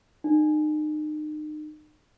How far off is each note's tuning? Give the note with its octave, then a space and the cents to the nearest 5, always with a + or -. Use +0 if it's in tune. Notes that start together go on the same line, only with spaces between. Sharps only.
D#4 -35